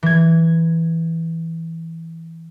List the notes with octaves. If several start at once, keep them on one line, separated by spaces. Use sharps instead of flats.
E3 G#6